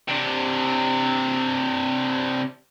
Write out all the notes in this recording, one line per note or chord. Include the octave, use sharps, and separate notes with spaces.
C3 D4